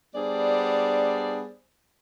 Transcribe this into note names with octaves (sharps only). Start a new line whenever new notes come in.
G3 B3 D4 G#4 C5 D5